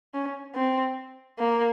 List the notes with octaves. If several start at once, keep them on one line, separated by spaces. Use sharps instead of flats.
C#4
C4
A#3